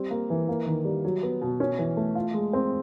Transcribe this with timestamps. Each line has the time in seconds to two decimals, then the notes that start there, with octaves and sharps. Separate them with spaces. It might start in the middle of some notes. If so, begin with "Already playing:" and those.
Already playing: G3 C4
0.11 A#3
0.30 E3
0.49 A#3
0.66 D#3
0.85 G3
1.05 F#3
1.23 B3
1.41 B2
1.60 C#4
1.79 E3
1.97 A3
2.15 F4
2.34 G#3
2.53 C4